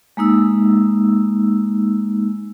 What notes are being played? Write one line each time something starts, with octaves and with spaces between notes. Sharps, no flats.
G#3 A#3 D#4 E6